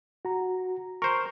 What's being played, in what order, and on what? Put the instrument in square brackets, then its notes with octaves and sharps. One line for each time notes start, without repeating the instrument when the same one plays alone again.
[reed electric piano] F#4 A#5
[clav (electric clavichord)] A#4 C5 [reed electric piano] C#6